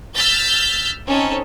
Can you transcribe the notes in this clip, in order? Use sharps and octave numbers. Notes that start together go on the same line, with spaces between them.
E6 F6 G6 A6 B6
C4 C#4 D#4 A4